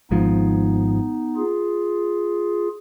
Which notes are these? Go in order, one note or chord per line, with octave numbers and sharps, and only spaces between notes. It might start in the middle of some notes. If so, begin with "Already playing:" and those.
G#1 G#2 F3 B3 D#4
F4 G#4